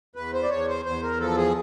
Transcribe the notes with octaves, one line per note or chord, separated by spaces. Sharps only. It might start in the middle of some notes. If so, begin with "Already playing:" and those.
E2 B4
C5
D5
E2 C#5
C5
E2 C5
A#4
F3 A4
G#4